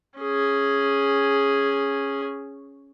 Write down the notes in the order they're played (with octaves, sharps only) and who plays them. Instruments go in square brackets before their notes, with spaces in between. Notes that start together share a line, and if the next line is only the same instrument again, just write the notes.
[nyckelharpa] C#4 G#4